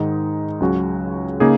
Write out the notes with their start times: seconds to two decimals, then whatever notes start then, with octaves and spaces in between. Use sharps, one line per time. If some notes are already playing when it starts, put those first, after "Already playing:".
Already playing: G#2 D#3 G#3 D#4
0.60 C#2 C#3 F#3 C#4 F#4
1.40 C#3 A#3 D#4 G#4